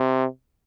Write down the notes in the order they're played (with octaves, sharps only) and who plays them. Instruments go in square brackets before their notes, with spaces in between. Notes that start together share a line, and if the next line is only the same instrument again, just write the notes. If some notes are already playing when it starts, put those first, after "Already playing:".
Already playing: [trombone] C3